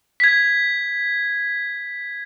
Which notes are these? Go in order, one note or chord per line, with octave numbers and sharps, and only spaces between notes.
G#6 B6